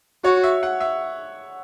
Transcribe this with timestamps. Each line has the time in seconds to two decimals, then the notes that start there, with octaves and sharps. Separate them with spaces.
0.24 F#4 C#5
0.43 E5
0.63 F#5
0.80 E5